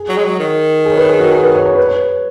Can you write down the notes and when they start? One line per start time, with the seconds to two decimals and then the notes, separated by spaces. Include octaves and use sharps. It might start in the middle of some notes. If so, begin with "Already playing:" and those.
Already playing: G#4
0.09 F#3
0.17 G#3
0.25 F#3
0.39 D#3
0.85 G#4
0.92 C#5
0.97 B4
1.09 G#4
1.20 F#4
1.32 G#4
1.43 B4
1.55 C#5
1.66 C#5
1.75 B4
1.85 C#5